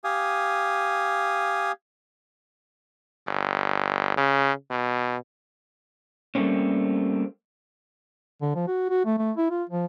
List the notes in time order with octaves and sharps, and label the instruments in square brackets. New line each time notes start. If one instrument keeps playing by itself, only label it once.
[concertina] G4 F5 G#5 D#6
[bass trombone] G1
C#3
B2
[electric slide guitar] G3 A3 A#3 C4 C#4
[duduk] D3
F3
F#4
F#4
A3
A3
E4
F4
F3